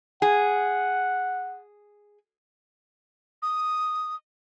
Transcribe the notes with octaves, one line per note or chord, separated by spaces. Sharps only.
G#4 F#5
D#6